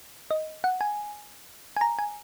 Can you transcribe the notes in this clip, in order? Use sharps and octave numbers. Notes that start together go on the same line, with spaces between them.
D#5
F#5
G#5
G#5
A#5
G#5